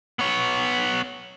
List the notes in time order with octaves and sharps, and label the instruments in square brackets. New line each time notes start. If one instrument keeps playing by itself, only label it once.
[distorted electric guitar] B3 C#5